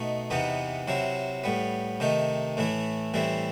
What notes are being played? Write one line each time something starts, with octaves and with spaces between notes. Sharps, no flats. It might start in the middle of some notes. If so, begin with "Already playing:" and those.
Already playing: B2 A3 D#4
E2 C3 E3 B3 D#4
C3 F#3 C4 E4
A2 G3 B3
C3 D#3 A3 D#4
A2 E3 A3 E4
A2 E3 G3 C4 E4